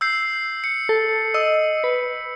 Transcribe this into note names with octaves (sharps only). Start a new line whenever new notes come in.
E6 G6 C7
C#7
A4
D#5 E6
B4